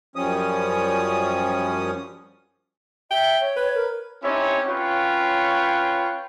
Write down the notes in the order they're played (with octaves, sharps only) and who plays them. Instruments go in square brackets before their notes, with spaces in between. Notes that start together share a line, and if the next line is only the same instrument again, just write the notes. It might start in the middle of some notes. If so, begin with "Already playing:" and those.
[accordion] F#2 F3 G3 C#4 D#6
[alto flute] E5 [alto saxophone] G5
[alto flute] C#5
[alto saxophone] B4
[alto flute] A#4
[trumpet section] C4 C#4 D#4 E4 G4 C#5
C#4 F4 B4 C#5 G5 C#6